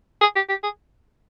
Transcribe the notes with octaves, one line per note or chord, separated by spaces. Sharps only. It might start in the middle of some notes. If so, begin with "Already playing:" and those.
G#4
G4
G4
G#4